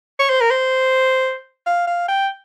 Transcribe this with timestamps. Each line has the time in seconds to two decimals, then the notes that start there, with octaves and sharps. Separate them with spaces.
0.19 C#5
0.30 C5
0.41 A#4
0.50 C5
1.66 F5
1.87 F5
2.08 G5